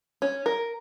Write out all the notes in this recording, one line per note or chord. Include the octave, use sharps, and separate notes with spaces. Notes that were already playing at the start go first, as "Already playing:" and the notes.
C#4
A#4